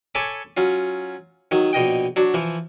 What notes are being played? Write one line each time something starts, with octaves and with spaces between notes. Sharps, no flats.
A4 C#5 G#5 B5 C#6 D6
F#3 C#4 F4
D#3 F#3
A#1 B2 D#5 G5
F#3 D4 F#4
E3 F3